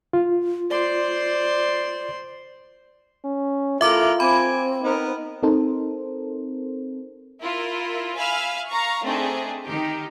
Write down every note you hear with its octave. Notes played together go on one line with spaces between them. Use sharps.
F4
C5 D5 C6
C#4
A3 E4 F4 A#4 E5 D6
C4 G#5 B5 D6
B3 D#4 A#4
C4 D#4 A4 A#4 C5
E4 F4 A#4
E5 F5 G#5 B5 E6 F6
F5 A#5 C#6
A3 C4 D4 D#4 G#4
D#3 D#4 G4